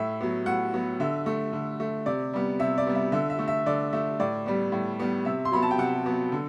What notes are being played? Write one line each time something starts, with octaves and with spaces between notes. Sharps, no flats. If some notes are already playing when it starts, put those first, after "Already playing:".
Already playing: A2 E5
F#3 B3
A2 F#5
F#3 B3
D3 E5
A3
D3
A3
C3 D5
G3 B3
C3 E5
D5
G3 B3
E5
D3 E5
E5
A3
E5
D3 D5
A3 E5
A2 D5
G3 B3
A2
G3 B3
C3 E5
C6
F#3 B3 B5
A5
G5
C3 F#5
F#3 B3
D3